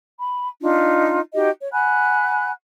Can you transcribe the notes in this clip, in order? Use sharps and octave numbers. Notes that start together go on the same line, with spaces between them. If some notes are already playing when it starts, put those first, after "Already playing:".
B5
D4 D#4 F4
D#4 F#4 G4 D#5
C#5
F#5 G#5 B5 F#6